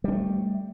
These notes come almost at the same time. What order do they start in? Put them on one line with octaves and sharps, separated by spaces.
G3 C#4 A3